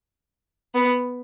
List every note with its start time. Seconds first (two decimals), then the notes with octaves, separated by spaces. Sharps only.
0.74 B3